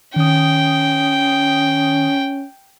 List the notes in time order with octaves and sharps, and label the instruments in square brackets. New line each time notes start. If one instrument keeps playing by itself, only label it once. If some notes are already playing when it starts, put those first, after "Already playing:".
[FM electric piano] D#3 D#6 [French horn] C#4 [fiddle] G5